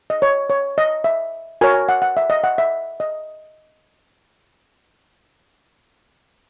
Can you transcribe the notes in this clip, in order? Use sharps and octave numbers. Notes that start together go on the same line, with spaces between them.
D#5
C#5
C#5
D#5
E5
F#4 A#4 C#5 G#5
G#5
F#5
F#5
E5
D#5
F#5
E5
D#5